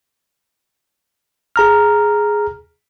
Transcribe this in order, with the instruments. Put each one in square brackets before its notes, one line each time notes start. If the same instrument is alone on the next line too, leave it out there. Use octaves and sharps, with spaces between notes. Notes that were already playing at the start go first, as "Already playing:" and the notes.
[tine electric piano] G#4 A#5 F6